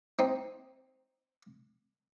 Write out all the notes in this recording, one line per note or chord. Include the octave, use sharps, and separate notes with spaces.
C4 D#4